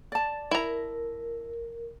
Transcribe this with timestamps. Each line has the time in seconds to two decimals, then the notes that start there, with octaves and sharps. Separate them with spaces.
0.12 D5 A5
0.51 E4 A#4 A#5